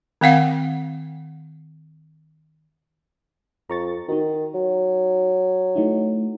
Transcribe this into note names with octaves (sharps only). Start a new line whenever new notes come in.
D#3 C4 F5 F#5
F2 A#5 C#6 A6
D#3 D#4 F#4
F#3
A3 D#4 E4